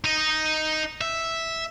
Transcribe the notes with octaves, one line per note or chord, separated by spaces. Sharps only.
D#4 D#5
E5